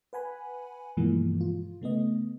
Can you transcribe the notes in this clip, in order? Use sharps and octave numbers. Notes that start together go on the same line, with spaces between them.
B4 F#5 G#5 B5
G2 B2 E3 F3 G#3 A#3
F4
C#3 A3 B3 D#5